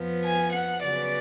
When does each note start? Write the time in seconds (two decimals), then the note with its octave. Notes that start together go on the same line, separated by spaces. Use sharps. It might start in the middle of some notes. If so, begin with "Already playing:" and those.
Already playing: F2 F3 B3
0.23 G#5
0.52 F#5
0.82 C#3 F#3 B3 D5